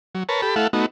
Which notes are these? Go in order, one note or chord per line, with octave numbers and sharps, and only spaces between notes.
F#3
A#4 B4 C#5 A5
G4 A4 B5
A3 E4 A4 F5 F#5
A3 B3 D#4 F#4